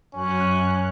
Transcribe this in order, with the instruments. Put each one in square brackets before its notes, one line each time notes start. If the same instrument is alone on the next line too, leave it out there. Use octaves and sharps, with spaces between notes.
[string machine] F#2 F#6 [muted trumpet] C#4